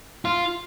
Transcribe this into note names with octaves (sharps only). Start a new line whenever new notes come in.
F4